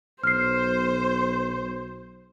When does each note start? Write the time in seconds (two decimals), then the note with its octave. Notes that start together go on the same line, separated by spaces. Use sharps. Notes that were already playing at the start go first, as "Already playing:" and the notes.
0.24 B1 C5 F6 C7